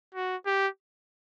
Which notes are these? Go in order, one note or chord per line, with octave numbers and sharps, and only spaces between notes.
F#4
G4